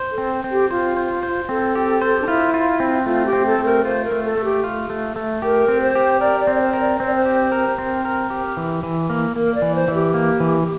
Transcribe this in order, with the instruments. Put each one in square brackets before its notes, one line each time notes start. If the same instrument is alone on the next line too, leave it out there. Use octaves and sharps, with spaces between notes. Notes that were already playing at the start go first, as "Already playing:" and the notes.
Already playing: [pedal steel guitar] C5
[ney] A4
[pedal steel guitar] C4
C4
[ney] G4
[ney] F4 [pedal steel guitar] C5
[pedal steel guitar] C5
C5
[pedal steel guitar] C4 [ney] A4
[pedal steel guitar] G4
C5
[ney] D4
[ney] E4 [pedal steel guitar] F4
[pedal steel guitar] F4
C4
[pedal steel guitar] A3 [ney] F4
[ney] G4
[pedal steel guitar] C4
[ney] A4
[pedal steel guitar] A3
[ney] A#4
[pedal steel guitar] F4 [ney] C5
[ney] A#4
[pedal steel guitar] A3
[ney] A4
[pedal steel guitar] A3
[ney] G4
[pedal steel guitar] F4
A3
A3
[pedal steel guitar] G4 [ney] A#4
[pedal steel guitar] C4
[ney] C5
[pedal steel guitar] G4
[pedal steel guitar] A#4 [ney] D5
[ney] D5
[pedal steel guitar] C4
[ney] D5
C5
[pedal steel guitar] A#4
[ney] D5
[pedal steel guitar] C4 [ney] C5
[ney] D5
C5
[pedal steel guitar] G4
A#4
C4
A#4
G4
E3
E3
A#3
[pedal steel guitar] A#3 [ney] A#4
[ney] D5
[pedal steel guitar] E3
[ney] C5
[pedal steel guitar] E3
[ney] G4
[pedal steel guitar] A#3
E3